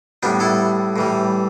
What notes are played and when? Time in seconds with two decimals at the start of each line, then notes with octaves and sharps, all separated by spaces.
0.23 A2 G3 B3 D4 G4
0.40 E4 A4
0.96 A2 E3 G3